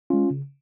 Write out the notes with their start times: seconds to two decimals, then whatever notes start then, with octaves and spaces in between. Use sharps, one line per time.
0.10 G#3 C#4 F4
0.30 C#3